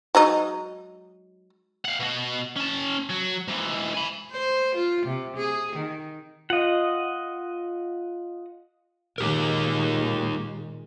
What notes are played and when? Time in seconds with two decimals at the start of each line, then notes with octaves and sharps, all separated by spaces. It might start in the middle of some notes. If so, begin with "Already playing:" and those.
0.15 F#3 G#3 D#4
1.85 F5 F#5
2.00 B2 F#4
2.57 C#4 A5
3.10 F#3
3.48 G#2 E3
3.95 G#5 B5
4.32 C5
4.76 F4
5.06 C3
5.37 G#4
5.76 D#3
6.50 F4 D#5 F5 F#5
9.18 A#2 D#3 G#3 D#4 G4 A#4